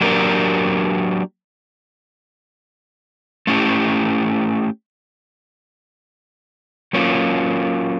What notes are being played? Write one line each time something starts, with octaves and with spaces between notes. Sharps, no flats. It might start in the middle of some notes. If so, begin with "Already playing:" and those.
F#3 A#3 D4 G4 A#4
A3 C#4 E4 G4
F#3 A#3 C#4 F4